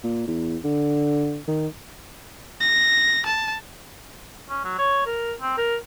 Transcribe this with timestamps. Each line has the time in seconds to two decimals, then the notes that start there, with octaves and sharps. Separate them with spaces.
0.04 A#2
0.27 E2
0.64 D3
1.48 D#3
2.60 A#6
3.26 A5
4.50 C#4
4.64 F#3
4.78 C#5
5.07 A#4
5.41 C4
5.57 A#4